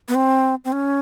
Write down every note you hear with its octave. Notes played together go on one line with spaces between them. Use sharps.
B3
C4
C4
C#4